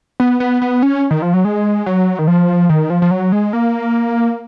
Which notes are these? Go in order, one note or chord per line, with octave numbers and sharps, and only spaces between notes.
B3
B3
B3
C#4
D#3
F3
F#3
G#3
F#3
D#3
F3
D#3
F3
F3
F#3
G#3
A#3